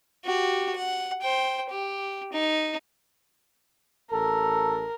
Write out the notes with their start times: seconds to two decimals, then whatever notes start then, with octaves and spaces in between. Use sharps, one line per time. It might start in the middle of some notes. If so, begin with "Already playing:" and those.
0.25 F#4 G4
0.75 F#5
1.22 C5 G5
1.70 G4
2.33 D#4
4.11 A1 A4 A#4